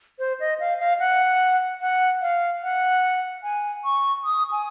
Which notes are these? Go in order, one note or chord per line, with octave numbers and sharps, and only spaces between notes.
C5
D#5
F5
F5
F#5
F#5
F5
F#5
G#5
C#6
D#6
G#5